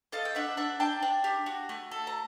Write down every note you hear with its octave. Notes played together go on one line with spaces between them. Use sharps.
A4 D#5 F5
G5
D4 E5 F#5
D4 E5 F#5
D4 G5 A5
D4
G4
F#4
A3
A4
A#5